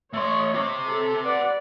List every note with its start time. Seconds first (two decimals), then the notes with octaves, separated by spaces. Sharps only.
0.13 A3 C#5 D#5 C6
0.54 G4 C5
0.85 A4
1.24 B4 D5 F#5